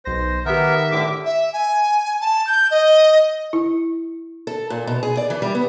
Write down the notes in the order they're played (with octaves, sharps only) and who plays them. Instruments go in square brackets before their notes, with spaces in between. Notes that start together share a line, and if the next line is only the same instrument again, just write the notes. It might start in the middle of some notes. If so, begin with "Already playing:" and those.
[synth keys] B1 A#6 [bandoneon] C5
[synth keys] D#3 G4 [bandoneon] B3 A#4 [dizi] E5
[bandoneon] A2 D3 D6
[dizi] E5
G#5
A5
G6
D#5
[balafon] E4
[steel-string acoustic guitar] A4
A#2
B2
G#4
D5
E3
G3
B3